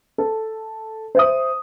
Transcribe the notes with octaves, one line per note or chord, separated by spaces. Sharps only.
A4
C5 E5 D#6